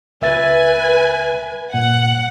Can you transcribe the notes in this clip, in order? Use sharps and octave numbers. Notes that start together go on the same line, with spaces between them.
C#2 B4 E5 G#5 A6
G2 A#2 F#5